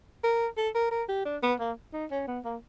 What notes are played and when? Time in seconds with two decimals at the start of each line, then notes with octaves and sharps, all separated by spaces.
0.23 A#4
0.57 A4
0.75 A#4
0.91 A#4
1.08 G4
1.25 D4
1.43 B3
1.60 A#3
1.93 D#4
2.11 C#4
2.27 B3
2.45 A#3